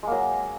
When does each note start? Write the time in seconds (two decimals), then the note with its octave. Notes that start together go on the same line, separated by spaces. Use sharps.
0.03 G#3
0.07 A#3
0.12 F#3